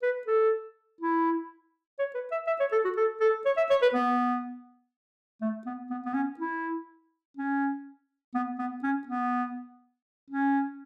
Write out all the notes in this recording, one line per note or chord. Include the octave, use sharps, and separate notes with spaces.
B4
A4
E4
C#5
B4
E5
E5
C#5
A4
F#4
A4
A4
C#5
E5
C#5
B4
B3
A3
B3
B3
B3
C#4
E4
C#4
B3
B3
C#4
B3
C#4